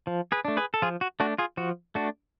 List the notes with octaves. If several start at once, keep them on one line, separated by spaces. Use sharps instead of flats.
F3
G#4 B4
A3 D4
G#4 B4
A4
F3 F4 G#4
F#4
A3 D4 F#4
F4 G#4
F3 F#4
A3 D4 F#4